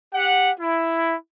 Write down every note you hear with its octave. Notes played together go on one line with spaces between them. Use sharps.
G4 F#5
E4